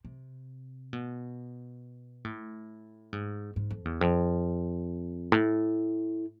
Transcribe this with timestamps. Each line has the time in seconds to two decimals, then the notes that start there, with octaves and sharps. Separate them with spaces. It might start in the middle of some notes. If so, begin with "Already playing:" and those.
0.05 C3
0.93 B2
2.25 A2
3.13 G#2
3.56 G#2
3.71 F2
3.85 E2
4.01 F2
5.32 A2